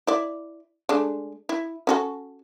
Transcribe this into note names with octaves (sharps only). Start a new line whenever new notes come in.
E4 D5
G#3 A3 D4
E4
C#4 F#4 A4